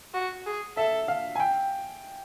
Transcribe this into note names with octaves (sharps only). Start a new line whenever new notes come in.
F#4
G#4
A4 E5
F5
G#5
G5